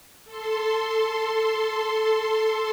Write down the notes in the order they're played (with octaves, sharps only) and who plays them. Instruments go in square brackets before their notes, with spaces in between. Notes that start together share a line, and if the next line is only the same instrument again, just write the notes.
[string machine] A4 C6